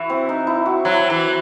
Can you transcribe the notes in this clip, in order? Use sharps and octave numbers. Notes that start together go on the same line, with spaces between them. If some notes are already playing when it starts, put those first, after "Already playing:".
Already playing: E3 E4 F#4
C4
D#4
E4
F#4
F#3 E4
E3